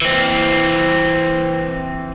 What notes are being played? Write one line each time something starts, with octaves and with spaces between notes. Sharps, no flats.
E3 C4